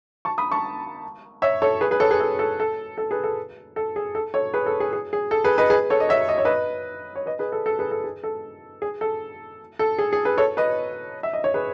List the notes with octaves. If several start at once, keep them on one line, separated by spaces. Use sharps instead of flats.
A5 C#6
B5 D#6
A5 C#6
C#5 E5
A4 C#5
G#4 B4
G#4 B4
A4 C#5
G#4 B4
A4
A4
A4
A4
G#4 B4
A4
A4
G#4
A4
A4 C#5
G#4 B4
A4
G#4
G#4
G#4
A4
G#4 B4
B4 D#5
G#4 B4
A4 C#5
D#5
C#5 E5
D#5
C#5
B4 D#5
C#5
B4 D#5
G#4 B4
A4
A4
G#4 B4
A4
G#4
A4
G#4
A4
A4
G#4
G#4
G#4 B4
A4 C#5
B4 D#5
E5
D#5
C#5
G#4 B4